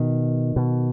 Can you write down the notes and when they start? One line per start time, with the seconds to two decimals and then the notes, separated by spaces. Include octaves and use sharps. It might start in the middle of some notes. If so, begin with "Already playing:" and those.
Already playing: B2 D#3
0.56 B2